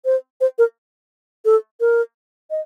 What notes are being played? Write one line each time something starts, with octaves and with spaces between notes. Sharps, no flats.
C5
C5
A#4
A4
A#4
D#5